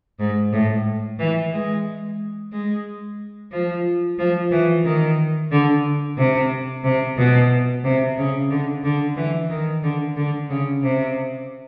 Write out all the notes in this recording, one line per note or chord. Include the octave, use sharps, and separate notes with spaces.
G#2
A2
E3
G#3
G#3
F3
F3
E3
D#3
D3
C3
C3
B2
C3
C#3
D3
D3
E3
D#3
D3
D3
C#3
C3